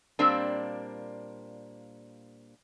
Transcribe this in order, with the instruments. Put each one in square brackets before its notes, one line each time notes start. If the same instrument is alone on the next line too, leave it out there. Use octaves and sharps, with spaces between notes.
[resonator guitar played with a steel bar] A#2 G3 A#3 C4 D4